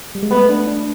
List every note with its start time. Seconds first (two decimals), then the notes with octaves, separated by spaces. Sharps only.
0.15 G3
0.23 G#3
0.31 A3 B3
0.49 D4
0.67 D4